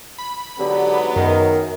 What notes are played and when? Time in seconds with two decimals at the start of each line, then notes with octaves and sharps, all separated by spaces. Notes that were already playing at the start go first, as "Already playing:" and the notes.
0.18 B5
0.59 G#2 D3 F#3 B3 G4
1.16 F#2 D#3 A#4